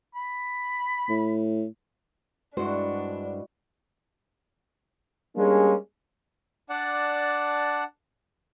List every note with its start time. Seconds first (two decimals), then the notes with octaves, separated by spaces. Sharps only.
0.15 B5
1.09 A2
2.57 G2 G#3 D4 E4 F#4 C5
5.36 G3 G#3 A#3 C#4 D4 G#4
6.70 D4 D5 F#5 A5